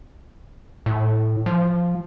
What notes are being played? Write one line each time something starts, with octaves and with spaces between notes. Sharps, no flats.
A2
F3